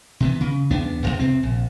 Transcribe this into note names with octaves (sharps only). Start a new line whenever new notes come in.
C3 E3 B3
C#3
E2 B3 D4
D#1 E2
C3 C4
A#1